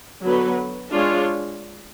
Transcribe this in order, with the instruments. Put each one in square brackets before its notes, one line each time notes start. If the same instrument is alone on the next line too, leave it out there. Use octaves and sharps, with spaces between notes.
[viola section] D3 F#3 B3 F#4 B4
G#3 D4 F4 G#4 C#5